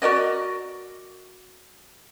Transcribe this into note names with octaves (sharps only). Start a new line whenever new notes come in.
F#4 A#4 D5 D#5